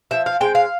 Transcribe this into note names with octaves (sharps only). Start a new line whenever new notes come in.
F3 E5
F5
G#3 C4 G5
F5